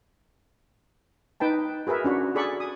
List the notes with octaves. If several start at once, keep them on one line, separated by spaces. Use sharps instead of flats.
D#4 B4 G5 A5
F#4 G#4 A#4 B4 E5
C#4 D4 F#4
F#4 G#4 A4 D5 B5 C#6
D#6